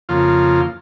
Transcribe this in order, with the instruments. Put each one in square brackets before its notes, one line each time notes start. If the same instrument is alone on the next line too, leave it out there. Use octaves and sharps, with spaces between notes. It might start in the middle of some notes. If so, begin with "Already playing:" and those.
[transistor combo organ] F2 C#3 F3 A#3 F4